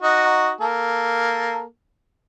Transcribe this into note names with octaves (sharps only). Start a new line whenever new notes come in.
D#4 F#4
A#3 A4